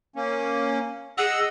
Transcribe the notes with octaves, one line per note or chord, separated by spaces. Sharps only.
A#3 C#4
G#4 D#5 F#5 E6